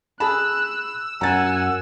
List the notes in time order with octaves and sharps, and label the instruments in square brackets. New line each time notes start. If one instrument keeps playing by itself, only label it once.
[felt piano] G#4 A5 B5 [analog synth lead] E6 [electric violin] F#6
[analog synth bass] F#2 [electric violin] F#5 G#5 [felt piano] A#5 A6